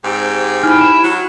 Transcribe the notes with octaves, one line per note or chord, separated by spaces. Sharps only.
G#2 C4 G4
D#4 E4 G#5 F6
E7
F#3